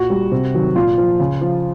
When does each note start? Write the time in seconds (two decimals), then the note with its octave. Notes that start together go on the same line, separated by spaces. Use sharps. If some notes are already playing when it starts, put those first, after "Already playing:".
Already playing: A#2 F#4
0.10 G3
0.32 C3
0.54 D#3 F#3
0.76 A#2 F4
0.98 F3
1.20 C#3
1.41 F3